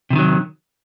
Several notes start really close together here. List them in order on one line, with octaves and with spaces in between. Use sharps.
C3 E3 D#3 F#3